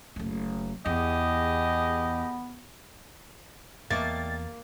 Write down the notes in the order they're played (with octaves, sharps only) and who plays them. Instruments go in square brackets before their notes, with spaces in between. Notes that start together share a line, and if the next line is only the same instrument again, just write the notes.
[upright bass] F#1 A3
[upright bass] E2 [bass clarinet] B3 [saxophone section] G4 G#4 D#5
[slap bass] E2 [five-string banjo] G3 A3 D#4 [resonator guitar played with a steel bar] A#3 [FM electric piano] A6